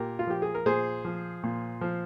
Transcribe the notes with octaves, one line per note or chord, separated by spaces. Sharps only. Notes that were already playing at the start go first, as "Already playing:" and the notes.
Already playing: A#2 G4 A#4
F4
F3 G4
G#4
A#4
A#2 G#4 C5
F3
A#2
F3